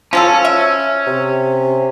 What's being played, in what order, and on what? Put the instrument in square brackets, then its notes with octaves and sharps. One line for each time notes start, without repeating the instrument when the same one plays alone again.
[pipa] F3 F#3 A4 [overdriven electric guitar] C#4
[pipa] E5
[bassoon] C3